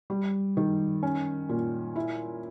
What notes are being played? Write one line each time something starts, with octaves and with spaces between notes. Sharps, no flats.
G3
D#3
C#4
A#2
E4